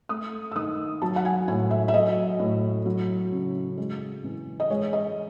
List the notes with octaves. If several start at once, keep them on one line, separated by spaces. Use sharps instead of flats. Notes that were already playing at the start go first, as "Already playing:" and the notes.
A3 D#6
E6
D#3 D#6
F#3 A5
F#5
G#5
A2 G#5
E5
E5
F#3 D#5
A2
F#3
C#3
G#3
E3
D#5
G#3 C#5
D#5